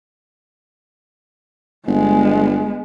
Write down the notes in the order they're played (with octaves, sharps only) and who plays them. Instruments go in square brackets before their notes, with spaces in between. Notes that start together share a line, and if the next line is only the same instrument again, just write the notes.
[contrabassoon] G1 [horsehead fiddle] G#3 B3